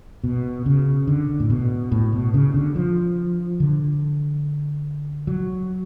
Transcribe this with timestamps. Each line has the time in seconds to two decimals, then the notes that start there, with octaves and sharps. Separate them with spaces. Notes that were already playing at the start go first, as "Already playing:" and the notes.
0.24 B2
0.66 C#3
1.07 D3
1.40 A2
1.50 B2
1.92 A2
2.13 B2
2.34 C#3
2.54 D3
2.76 F3
3.60 D3
5.27 F#3